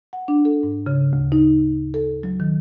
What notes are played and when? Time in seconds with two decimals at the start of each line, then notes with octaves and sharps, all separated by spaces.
0.13 F#5
0.28 D4
0.45 A4
0.63 G#2
0.86 C#3
1.13 D2
1.32 D#4
1.94 A4
2.23 F#3
2.40 D#3